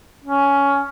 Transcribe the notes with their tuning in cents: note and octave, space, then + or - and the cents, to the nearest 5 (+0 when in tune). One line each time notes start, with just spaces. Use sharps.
C#4 +10